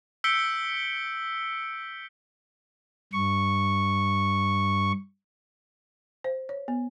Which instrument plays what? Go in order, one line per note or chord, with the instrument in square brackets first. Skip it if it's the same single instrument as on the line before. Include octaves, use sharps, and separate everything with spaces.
[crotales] E6 G6 B6 C#7 D7 G7
[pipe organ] G2 C#6
[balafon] C5
C#5
B3